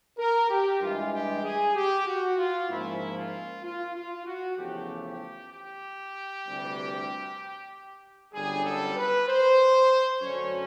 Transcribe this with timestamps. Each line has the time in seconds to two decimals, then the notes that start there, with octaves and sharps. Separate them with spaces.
0.19 A#4
0.49 G4
0.81 G2 E3 G#3 F4
1.13 G4
1.44 G#4
1.75 G4
2.06 F#4
2.38 F4
2.69 G#2 F3 A#3 C#4 E4
3.17 F4
3.64 F4
3.95 F4
4.26 F#4
4.57 E2 C#3 F3 A3 G4
5.04 G4
5.51 G4
6.45 D2 C3 E3 G3
8.33 G1 F#2 D3 G3 G#4
8.65 A4
8.96 B4
9.28 C5
10.21 F#2 D3 F#3 A3 C#4 C#5